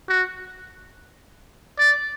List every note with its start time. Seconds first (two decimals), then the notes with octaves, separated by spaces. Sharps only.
0.09 F#4
1.78 D5